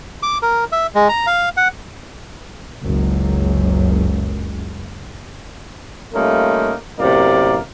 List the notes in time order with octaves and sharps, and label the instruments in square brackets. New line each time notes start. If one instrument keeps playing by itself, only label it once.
[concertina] D6
A#4
E5
G#3
A#5
F5
F#5
[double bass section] F#1 C#2 F#2
[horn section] G3 A3 A#3 C#4 D#4 F4
F#2 A2 C3 A#3 A#4 D5